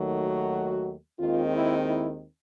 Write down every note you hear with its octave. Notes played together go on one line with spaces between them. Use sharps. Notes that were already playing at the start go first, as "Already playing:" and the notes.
Already playing: D#2 D#3 F#3 A3
F#4
D#2 D#3 G#3 C4 F4
E4
E4